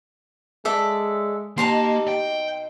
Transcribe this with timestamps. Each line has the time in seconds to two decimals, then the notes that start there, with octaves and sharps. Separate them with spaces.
0.65 G#3 A4 D5 E5
1.58 B2 A#3 C4 D#4 G4 A5 A#5 C6
2.08 G5